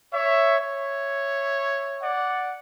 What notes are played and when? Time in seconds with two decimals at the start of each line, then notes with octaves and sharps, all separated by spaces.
0.13 C#5 E5
0.60 C#5 E5
2.03 D5 F#5